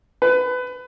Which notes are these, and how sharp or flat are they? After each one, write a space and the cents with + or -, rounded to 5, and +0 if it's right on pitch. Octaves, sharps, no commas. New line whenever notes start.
B4 +25